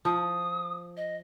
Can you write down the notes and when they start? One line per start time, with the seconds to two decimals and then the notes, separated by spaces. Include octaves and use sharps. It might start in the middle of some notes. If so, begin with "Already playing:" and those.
0.05 F3 D#6
0.97 D#5